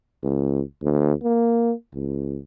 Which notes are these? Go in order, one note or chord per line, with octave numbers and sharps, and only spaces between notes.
C#2
D2
A#3
C#2